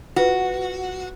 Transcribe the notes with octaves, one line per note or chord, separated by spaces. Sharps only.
F4 F#4 B4